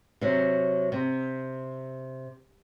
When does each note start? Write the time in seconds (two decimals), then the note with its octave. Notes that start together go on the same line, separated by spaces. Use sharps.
0.21 C3 F#3
0.92 C3